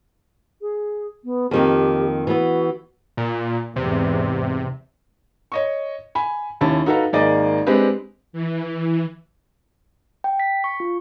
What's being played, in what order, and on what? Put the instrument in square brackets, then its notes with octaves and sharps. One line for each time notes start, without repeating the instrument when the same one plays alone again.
[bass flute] G#4
B3
[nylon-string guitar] F2 D#3 A#3 [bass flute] G4
[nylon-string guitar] E3 B3 [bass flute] F#4
[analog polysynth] A#2
[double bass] E2 G#2 [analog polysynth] C3
[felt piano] C#5 D#5 C#6
G#5 B5
D#2 C#4 E4 A5
D#4 F#4 A4 B4 F5
G#1 A#3 D#4 G#4 D5 D#5
G#3 C4 D4 G4 B4
[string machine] E3
[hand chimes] G5
B6
C#6
F4